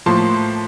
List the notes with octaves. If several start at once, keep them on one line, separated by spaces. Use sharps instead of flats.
A2 F3 A#3 A5 C6